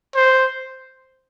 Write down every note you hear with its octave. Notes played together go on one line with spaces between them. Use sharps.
C5